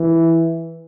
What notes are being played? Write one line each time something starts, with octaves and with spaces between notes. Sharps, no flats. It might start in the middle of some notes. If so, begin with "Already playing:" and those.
Already playing: E3